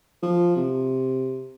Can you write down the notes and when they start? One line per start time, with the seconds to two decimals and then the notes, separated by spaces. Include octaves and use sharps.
0.23 F3
0.56 C3